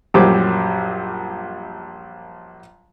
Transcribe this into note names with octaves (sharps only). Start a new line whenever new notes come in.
A#1 F#2 G3 G4 C5 D6